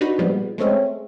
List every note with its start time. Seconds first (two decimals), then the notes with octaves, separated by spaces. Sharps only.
0.01 D4 D#4 F#4 B4
0.18 A#2 F3 G3 G#3 B3
0.58 G#3 A3 C4 C#4